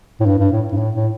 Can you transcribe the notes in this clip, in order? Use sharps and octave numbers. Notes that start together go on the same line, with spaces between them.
A2
G2
G2
A2
G2
A2
A2